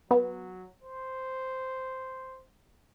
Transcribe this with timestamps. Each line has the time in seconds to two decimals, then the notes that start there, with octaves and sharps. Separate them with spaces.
0.11 F#3 B3
0.83 C5